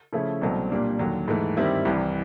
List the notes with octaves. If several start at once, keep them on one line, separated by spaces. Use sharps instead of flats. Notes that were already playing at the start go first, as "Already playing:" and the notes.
C#3 F3 A3 C#4 E4
C2 B2 F#3 A3 C4
A#2 G3 A#3 D4
D#2 D3 F#3
G#2 E3 A3
G2 D#3 G3 C4 E4
C2 C3 E3